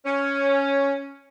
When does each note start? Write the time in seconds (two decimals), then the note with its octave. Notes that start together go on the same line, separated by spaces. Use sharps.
0.06 C#4